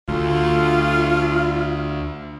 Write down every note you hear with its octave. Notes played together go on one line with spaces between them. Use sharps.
D2 F4